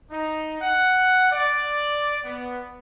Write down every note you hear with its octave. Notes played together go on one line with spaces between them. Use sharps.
D#4
F#5
D5
B3